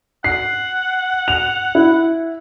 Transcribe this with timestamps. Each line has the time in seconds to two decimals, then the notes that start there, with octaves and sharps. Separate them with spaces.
0.24 F#5 C7
1.28 F7
1.75 E4